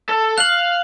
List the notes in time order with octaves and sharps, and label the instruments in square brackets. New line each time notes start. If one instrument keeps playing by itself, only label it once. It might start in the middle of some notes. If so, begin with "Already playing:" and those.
[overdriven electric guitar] A4
[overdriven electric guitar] F5 [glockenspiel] F#6 F#7